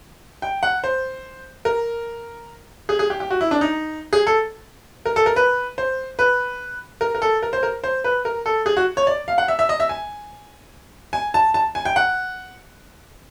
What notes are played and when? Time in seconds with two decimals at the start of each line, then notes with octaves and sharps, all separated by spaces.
0.42 G5
0.63 F#5
0.84 C5
1.65 A#4
2.89 G#4
2.99 G#4
3.10 G4
3.20 G4
3.30 F#4
3.41 E4
3.51 D4
3.61 D#4
4.13 G#4
4.27 A4
5.06 A#4
5.16 A4
5.26 A#4
5.36 B4
5.78 C5
6.19 B4
7.01 A#4
7.15 A#4
7.22 A4
7.43 A#4
7.53 C5
7.63 A#4
7.84 C5
8.04 B4
8.25 A#4
8.46 A4
8.66 G#4
8.77 F#4
8.97 C#5
9.07 D5
9.28 F5
9.38 F#5
9.48 E5
9.59 E5
9.69 D#5
9.80 E5
9.89 G#5
11.13 G#5
11.34 A5
11.54 A5
11.75 G#5
11.85 G5
11.96 F#5